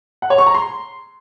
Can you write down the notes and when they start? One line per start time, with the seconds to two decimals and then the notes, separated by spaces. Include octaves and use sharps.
0.22 F#5
0.30 C#5
0.38 C#6
0.46 A#5
0.54 C6